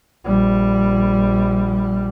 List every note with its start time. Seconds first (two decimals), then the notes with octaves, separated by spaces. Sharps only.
0.24 A#1 G3